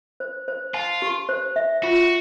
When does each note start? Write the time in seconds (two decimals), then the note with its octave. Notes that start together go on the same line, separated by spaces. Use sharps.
0.20 C5
0.48 C5
0.74 F4 A5
1.02 G4
1.29 C5
1.56 E5
1.82 F4 F#4